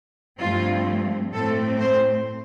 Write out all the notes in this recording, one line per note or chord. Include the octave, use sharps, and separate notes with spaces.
G2 F3 A3 C4 F4
A2 A3 C4 A4
C5